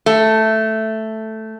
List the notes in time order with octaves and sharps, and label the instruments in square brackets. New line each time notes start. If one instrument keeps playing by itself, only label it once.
[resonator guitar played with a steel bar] A3